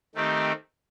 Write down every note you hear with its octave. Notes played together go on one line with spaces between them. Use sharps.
D#3 A3 C4 D#4 G4